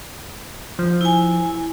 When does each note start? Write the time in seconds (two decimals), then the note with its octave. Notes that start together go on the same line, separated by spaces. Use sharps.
0.79 F3
1.01 E4 G#5